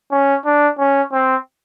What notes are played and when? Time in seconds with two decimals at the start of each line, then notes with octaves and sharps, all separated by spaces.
0.11 C#4
0.45 D4
0.79 C#4
1.12 C4